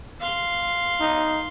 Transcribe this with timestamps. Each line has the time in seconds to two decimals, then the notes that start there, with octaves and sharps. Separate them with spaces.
0.20 F5 C6
1.00 D#4